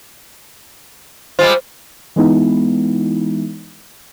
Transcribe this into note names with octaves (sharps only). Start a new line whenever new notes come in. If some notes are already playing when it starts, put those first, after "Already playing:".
G3 G#3 F4 C5
E3 G#3 B3 D#4 E4